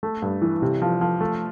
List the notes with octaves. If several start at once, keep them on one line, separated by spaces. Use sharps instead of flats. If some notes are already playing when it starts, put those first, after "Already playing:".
A3
G2
E3
C3
F3
F3
A3